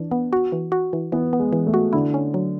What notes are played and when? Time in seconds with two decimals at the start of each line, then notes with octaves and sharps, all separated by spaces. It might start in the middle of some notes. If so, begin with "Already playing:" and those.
Already playing: E3 D4
0.11 B3
0.33 F#4
0.52 E3
0.72 F#4
0.93 E3
1.12 E3 B3
1.33 B3
1.39 G#3
1.53 E3
1.67 A3
1.74 F#4
1.93 D3 E4
2.14 C#4
2.34 F#3